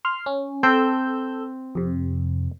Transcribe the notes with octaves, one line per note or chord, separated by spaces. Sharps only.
C6 F6
C#4
C4 A4 E6 G6
F2 C3